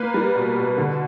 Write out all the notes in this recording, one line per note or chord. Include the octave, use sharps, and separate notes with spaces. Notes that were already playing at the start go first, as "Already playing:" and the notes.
Already playing: A#3 B4
G3
B2
B2
D3